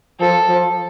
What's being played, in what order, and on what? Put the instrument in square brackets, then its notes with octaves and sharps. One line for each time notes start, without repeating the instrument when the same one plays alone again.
[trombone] F3 [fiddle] A4
[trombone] F3